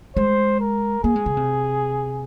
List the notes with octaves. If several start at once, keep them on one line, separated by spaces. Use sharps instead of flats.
G#3 C5
A#4
A#3 G#4
G#3
C#3
C3